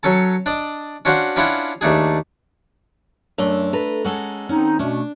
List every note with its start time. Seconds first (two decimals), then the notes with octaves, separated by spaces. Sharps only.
0.03 F#3 C#4 A4 A5
0.46 D4 D5 D#5
1.05 C#4 D4 F#4 C5 F5 F#5
1.36 C#4 D4 E4 F4 F5 F#5
1.81 D#2 A3 D4 G#4
3.38 F#2 A3 D4
3.73 A4 B4 A#5
4.05 G#3 C#4 F#4 G#4 A4
4.49 D#3 C4 C#4 D#4
4.79 B2 A3 C#4 D4